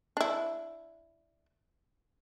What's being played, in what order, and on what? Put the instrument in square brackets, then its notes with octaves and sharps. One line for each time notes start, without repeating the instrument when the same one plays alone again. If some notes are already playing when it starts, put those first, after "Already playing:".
[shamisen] D4 E4